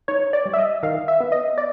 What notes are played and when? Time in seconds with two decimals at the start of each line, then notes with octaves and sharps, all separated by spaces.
0.08 D#4 C#5
0.33 D5
0.46 G3
0.53 E5
0.58 D#5
0.83 D#3 F5
1.08 E5
1.20 B3
1.32 D#5
1.58 D5